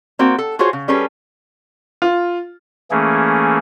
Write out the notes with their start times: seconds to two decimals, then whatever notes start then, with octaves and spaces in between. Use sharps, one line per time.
0.19 A#3 C4 F#4
0.38 A4
0.59 F4 F#4 G#4 C5 C#5
0.73 C#3
0.88 G3 C#4 G#4 A4 B4
2.02 F4
2.91 E3 A3 A#3 C#4 G#4